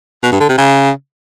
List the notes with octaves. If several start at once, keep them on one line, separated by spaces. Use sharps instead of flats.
B2
G2
D3
C3
C#3